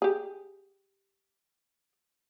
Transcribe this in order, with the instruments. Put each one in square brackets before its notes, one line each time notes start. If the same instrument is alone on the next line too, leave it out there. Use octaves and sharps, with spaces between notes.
[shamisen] G4 G#4